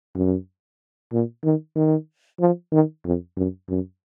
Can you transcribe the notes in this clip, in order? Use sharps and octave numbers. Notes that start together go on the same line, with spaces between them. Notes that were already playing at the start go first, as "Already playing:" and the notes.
F#2
A#2
D#3
D#3
F3
D#3
F2
F#2
F#2